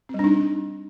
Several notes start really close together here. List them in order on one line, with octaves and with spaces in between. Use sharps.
C4 G3 D4 D#4